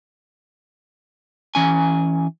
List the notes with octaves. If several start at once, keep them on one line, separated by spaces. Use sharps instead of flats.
E3 C#4 G#5